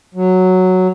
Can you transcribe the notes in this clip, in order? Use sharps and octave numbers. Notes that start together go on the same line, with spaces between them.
F#3